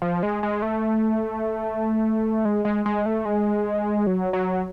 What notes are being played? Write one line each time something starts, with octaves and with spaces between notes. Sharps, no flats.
F3
G#3
G#3
A3
G#3
G#3
G#3
A3
G#3
F#3
F#3